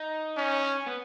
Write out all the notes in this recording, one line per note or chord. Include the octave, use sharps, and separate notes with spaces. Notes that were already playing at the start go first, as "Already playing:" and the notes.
Already playing: D#4
C#4
B3